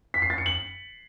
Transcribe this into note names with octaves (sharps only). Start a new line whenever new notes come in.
B6
C7
A6
C#7
F#7